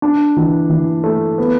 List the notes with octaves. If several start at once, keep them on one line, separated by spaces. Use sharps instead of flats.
D4
E3
E3
A3
B3